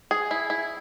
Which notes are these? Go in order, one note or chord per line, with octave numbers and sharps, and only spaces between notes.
G#4
E4
E4